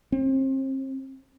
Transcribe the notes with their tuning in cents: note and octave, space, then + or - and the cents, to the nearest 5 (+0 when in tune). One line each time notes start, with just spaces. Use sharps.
C4 +35